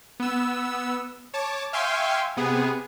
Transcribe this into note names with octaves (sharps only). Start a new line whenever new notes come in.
B3 E6
C#5 A5 D6
E5 F5 G5 G#5 C6 C#6
C3 B3 G#4